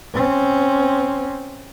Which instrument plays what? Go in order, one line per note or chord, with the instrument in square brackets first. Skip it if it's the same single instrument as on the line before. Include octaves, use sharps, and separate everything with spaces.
[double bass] C4 C#4